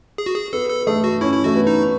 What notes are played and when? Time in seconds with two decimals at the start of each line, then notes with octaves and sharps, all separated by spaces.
0.18 G#4
0.26 F#4
0.35 G#4
0.53 B3 A4
0.70 A4
0.87 A3 G#4
1.04 F#4
1.21 C#4 E4
1.33 E4
1.44 A3 F#4
1.56 B3
1.67 D#4